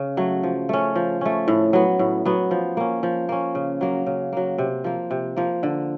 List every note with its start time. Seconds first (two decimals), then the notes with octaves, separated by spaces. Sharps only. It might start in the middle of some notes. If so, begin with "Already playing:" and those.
Already playing: C#3
0.17 F#3 A3
0.43 F3
0.69 A3 C#4
0.95 F3
1.21 A3 C#4
1.48 A2
1.73 F#3 B3
1.99 A2
2.25 F#3 B3
2.51 F3
2.77 A#3 C#4
3.03 F3
3.29 A#3 C#4
3.55 C#3
3.81 F#3 A#3
4.06 C#3
4.33 F#3 A#3
4.58 C3
4.84 F3 A#3
5.11 C3
5.36 F3 A#3
5.63 D3